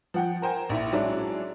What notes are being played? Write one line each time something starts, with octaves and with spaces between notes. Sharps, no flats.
F3 F#5 G5
A#4 C5 G5 G#5
A#1 E4
F#3 G#3 C#4 D4 E4